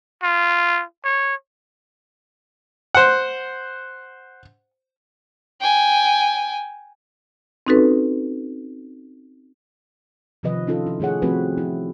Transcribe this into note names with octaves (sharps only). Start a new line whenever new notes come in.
F4
C#5
C5 F#5
G5 G#5
C4 C#4 D#4 F#4 A4 B4
C3 D#3 F3 B4 D#5
C#4 D#4 F4 A4
E4
D#3 A3 G#4 C#5 F#5
F3 A3 C4 F#4 B4
E4